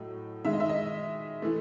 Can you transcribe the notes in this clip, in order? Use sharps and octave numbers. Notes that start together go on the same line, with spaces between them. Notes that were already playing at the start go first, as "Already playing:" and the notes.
Already playing: A2 F#3 A3 D#5
D#3 G#3 E5
D#5
E5
D#5
E3 A3